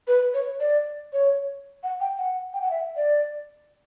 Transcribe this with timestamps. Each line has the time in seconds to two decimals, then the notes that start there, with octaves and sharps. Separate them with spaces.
0.08 B4
0.34 C#5
0.60 D5
1.13 C#5
1.83 F#5
2.01 G5
2.18 F#5
2.54 G5
2.62 F#5
2.71 E5
2.96 D5